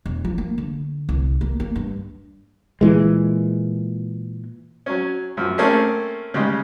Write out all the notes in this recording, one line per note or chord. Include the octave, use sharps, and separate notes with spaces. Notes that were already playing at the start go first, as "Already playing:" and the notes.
E1
F3
A#3
D3
C2
A#3
A#3
G2
A#2 E3 G#3
F#3 C#4
F#2 F3
A3 A#3 C4 C#4 G#4 A4
C#3 G3 G#3 D#4